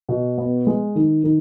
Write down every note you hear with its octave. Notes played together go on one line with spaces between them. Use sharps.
B2
B3
G#3
D#3
D#3